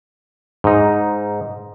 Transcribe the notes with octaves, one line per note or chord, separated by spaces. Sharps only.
G#2 D#4